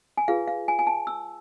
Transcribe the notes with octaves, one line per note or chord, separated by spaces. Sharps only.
G#5
F4 G#4 B4 F5
F5
G#5
G#5
A5
E6